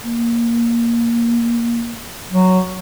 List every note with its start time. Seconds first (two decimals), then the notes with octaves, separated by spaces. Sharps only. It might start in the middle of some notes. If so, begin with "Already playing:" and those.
0.04 A#3
2.30 F#3